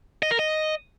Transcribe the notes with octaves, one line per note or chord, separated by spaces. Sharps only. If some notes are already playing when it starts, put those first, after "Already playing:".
D#5
A#4
D#5